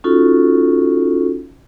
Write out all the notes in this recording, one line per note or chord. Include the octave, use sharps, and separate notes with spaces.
C#4 D#4 F4 F#4 A4